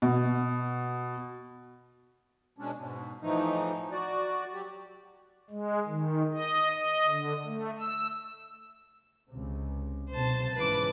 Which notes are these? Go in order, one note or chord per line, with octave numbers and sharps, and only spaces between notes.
B2
B2 G#3 C#4 D4
G#2 B2
A2 E3 F3 A3 D#4
F#4 D5
F#3 G4
G#3
D#3
D#5
D#5
D3
A3
E6
C#2 C3
B1 C3 C5 A5
G#2 C#3 E3 B4 D6